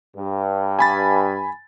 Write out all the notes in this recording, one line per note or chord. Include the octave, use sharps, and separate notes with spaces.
G2
G#5 B5 A6